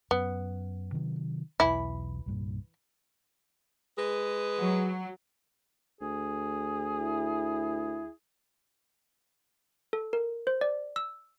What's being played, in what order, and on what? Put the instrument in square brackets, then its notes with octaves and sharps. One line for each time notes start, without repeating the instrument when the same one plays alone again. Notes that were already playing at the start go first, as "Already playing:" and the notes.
[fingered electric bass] F#2 [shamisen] B3
[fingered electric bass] C3 D#3 F#3
[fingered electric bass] B1 E2 [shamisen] E3 E4
[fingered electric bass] C2 G2 A#2
[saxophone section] G#3 G#4 B4
[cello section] F#3
[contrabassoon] D2 [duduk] G#4
[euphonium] E4
[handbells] A4
A#4
C5
D5
E6